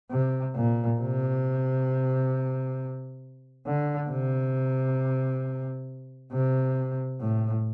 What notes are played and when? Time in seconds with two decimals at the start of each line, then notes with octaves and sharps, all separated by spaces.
0.11 C3
0.56 A#2
1.00 C3
3.66 D3
4.10 C3
6.33 C3
7.20 A2